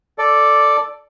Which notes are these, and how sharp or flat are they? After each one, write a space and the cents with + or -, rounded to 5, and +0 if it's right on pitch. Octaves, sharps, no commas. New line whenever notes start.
A4 +0 D5 +0